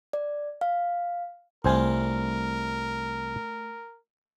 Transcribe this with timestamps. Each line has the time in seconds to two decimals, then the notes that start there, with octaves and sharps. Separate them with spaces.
0.13 D5
0.61 F5
1.64 C2 A3 D4 F4 A#4 C5 G#5